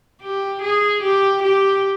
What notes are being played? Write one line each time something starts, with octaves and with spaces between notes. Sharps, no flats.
G4
G#4
G4
G4